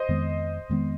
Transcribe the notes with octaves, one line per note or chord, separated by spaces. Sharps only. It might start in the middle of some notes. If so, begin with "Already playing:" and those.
Already playing: C5 D#5
F2 D#3 G#3 B3
F2 D#3 G#3 B3